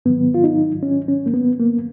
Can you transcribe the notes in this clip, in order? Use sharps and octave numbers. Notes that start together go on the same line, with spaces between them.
G#2 D#3 F#3 B3
F4
D#4
C#4
C#4
A#3
B3
A#3